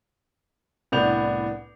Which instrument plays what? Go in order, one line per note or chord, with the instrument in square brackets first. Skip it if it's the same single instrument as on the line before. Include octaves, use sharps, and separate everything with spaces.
[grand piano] C2 A2 B3 D4 G6 F7